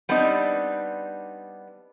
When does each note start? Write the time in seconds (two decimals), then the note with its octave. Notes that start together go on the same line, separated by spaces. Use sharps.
0.09 G3 B3 C4 D4 D#4